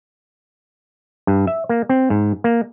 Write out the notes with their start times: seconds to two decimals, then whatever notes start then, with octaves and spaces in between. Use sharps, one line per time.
1.27 G2
1.47 E5
1.69 A#3
1.89 C4
2.10 G#2
2.44 A#3